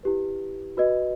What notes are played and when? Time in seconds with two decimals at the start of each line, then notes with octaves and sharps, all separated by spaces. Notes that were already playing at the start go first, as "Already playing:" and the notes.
0.03 E4 G4 B4
0.77 F#4 B4 D#5